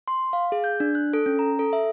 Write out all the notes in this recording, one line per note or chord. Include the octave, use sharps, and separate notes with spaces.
C6
F5
G#4
G6
D4
F#6
A4
C#4
A#5
A4
E5